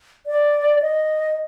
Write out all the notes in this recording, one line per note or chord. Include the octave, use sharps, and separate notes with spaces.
D5
D#5